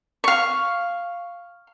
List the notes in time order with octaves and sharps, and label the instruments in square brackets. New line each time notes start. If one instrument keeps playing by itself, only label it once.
[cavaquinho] F5 C#6